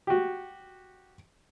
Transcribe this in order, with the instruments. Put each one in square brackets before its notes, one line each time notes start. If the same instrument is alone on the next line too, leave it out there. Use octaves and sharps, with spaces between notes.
[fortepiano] F#4 G4